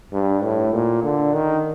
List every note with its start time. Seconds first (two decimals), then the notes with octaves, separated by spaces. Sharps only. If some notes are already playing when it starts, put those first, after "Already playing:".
0.12 G2
0.43 A2
0.74 A#2
1.03 D3
1.33 D#3